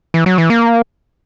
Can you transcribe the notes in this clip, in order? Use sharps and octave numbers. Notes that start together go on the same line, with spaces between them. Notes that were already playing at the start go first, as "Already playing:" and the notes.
E3
F#3
E3
A#3